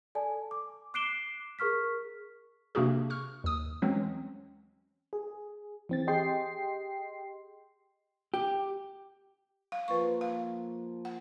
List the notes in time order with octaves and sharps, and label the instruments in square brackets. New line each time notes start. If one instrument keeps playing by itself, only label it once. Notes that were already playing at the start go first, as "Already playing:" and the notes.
[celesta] A4 D5 G#5 A5
D6
D6 F#6 C7 D7 E7 G7
G#4 A#4 C#6 F6 B6
[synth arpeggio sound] C3 A#3 D4 F#4 G#4
C#6 F6
D#2 D#6
E3 F#3 G#3 C4 C#4
[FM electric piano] G#4
E3 C4 A6
G4 G#4 D#5 G5 C6 C7
[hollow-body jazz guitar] G4
[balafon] F5
[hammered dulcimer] F3 A#3 [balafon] B4 C#6
[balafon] F5
F#5